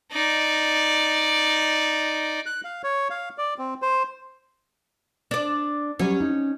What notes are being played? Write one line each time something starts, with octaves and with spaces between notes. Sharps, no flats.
D#4 D5
F#6
F5
C#5
F5
D5
C4
C5
D4 D5
F#3 G3 C#4
D#4